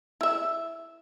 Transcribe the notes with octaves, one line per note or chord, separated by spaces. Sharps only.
E4 E5